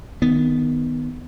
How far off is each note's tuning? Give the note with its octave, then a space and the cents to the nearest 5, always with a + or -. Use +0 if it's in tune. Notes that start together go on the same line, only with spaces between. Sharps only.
D#3 -10 B3 +0